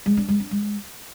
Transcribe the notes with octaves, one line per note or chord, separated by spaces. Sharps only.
G#3
D4
G#3
D4
G#3